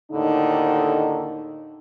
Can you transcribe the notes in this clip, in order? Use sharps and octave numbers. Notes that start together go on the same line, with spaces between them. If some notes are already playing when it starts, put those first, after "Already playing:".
D#2 A2 D3 D#4